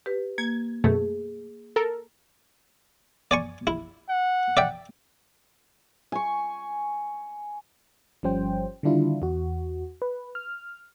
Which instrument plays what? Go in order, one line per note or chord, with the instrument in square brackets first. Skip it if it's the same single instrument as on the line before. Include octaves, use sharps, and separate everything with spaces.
[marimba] G4 B4
[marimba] A#3 [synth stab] G#6
[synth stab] F#2 B2 A3 [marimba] G#4
[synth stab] A4 A#4
[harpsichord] D5 G#5 C#6
E4
[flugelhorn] F#5
[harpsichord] D5 E5 G5
[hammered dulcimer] G#5 C#6
[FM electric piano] G1 F3 G3 C#4 C5 G5
D3 D#3 G3 D4 E4 F4
E2 F#4
B4
F6